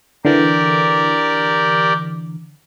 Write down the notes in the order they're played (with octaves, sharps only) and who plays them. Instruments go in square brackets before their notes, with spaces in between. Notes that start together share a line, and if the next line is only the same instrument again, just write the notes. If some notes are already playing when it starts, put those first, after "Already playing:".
[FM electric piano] D3 E3 [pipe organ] G4 A#4 D5